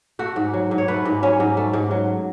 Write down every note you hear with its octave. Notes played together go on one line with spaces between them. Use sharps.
A3 F#4
G#2
F#3
G#2
C#5
A3 B4
G#2
F#3 C#4
G#2
A3
G#2
F#3